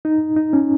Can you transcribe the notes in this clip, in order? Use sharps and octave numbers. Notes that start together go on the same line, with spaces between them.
D#4
D#4
C#4